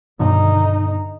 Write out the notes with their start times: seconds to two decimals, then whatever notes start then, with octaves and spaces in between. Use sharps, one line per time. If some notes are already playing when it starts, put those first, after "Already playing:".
0.20 G2 B2 D3 D#3 D#4